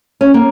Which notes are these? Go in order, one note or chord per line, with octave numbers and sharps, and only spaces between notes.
C#4
A#3